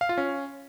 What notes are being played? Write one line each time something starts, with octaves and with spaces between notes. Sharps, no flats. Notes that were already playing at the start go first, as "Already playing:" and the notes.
F5
F4
C#4